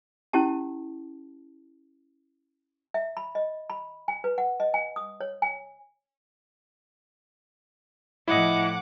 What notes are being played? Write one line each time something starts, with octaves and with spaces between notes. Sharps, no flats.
C#4 E4 G4 A5
E5
B5
D#5
B5
G#5
B4
F#5
D#5
G#5
D#6
C#5
G#5
A2 F3 E4 D#5 F#5 D6